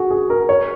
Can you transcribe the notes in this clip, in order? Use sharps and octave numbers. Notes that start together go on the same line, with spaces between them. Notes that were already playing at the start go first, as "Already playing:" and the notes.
Already playing: F#4 G#4
G#4
A#4
C#5